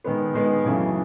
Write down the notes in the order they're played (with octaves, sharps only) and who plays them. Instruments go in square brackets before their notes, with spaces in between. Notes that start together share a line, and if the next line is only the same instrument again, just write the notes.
[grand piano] D#3 G#3 B3
D#3 G#3 B3
F#2 C#3 E3 A3